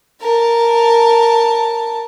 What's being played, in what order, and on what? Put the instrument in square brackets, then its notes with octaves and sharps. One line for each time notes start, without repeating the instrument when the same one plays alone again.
[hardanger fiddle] A#4 A5